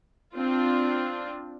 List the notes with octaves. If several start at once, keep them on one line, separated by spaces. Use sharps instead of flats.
C4 D4 F4